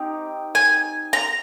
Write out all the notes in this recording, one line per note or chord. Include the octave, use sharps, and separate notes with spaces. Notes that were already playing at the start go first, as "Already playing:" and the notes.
Already playing: C4 D#4 G4
G#5
A#5